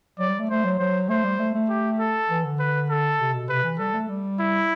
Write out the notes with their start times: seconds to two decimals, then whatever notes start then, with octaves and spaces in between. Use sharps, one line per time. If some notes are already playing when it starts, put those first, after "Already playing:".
0.19 F#3 D5
0.29 G3
0.39 A3
0.50 A3 C5
0.64 F#3
0.79 F#3 C5
1.09 A3 C5
1.24 G3
1.39 A3
1.54 A3
1.69 G4
1.99 A4
2.30 E3
2.45 D3
2.59 B4
2.90 A4
3.19 C3
3.34 B2
3.49 C3 B4
3.63 E3
3.78 G3 A4
3.94 A3
4.09 G3
4.39 E4